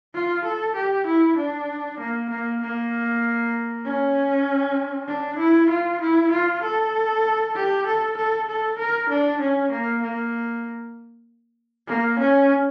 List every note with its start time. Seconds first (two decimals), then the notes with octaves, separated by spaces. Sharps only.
0.14 F4
0.45 A4
0.76 G4
1.07 E4
1.37 D4
1.99 A#3
2.30 A#3
2.61 A#3
3.85 C#4
5.08 D4
5.39 E4
5.70 F4
6.01 E4
6.32 F4
6.63 A4
7.55 G4
7.87 A4
8.17 A4
8.48 A4
8.79 A#4
9.10 D4
9.41 C#4
9.72 A#3
10.02 A#3
11.88 A#3
12.19 C#4